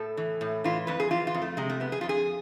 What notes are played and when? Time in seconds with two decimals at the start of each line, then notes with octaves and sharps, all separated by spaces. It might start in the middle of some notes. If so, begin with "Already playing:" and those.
Already playing: A2 A4
0.17 E3
0.41 A2
0.64 E3 F4
0.87 F2 B4
1.00 G#4
1.11 E3 F4
1.27 F4
1.34 F2
1.42 A3
1.57 C3 G#3
1.69 A3
1.80 F2 B3
1.92 G#4
2.01 F2 F4
2.09 G#4